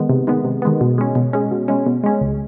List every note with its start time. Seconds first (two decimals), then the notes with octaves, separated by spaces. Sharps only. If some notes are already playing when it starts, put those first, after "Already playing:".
Already playing: D#3 G#3 B3
0.09 C3
0.27 D#3 G#3 B3
0.44 C3
0.62 D#3 G#3 B3
0.81 B2
0.98 G#3 C#4
1.15 B2
1.33 G#3 C#4
1.51 B2
1.68 G#3 C#4
1.87 B2
2.04 G#3 C#4
2.21 C#2